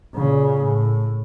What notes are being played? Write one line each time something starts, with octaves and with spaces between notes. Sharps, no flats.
A#2 C#3
A2